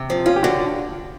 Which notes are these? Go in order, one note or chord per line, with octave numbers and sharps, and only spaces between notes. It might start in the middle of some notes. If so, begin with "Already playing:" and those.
Already playing: C3
F3
C#4 F4
G4
D3 F#4